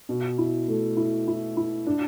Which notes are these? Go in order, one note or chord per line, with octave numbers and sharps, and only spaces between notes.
B2
E4
A3
E4
E4
E4
D4